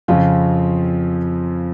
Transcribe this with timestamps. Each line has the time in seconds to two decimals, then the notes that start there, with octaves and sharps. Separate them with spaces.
0.08 F2 C#3 F3 C4 F4